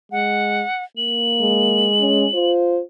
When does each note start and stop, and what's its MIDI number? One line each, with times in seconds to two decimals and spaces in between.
0.12 0.64 56
0.12 0.84 78
0.97 1.91 58
0.97 2.51 102
1.41 2.28 56
2.00 2.26 61
2.34 2.82 65
2.34 2.81 72